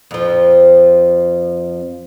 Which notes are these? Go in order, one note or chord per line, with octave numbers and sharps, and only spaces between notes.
F2 F3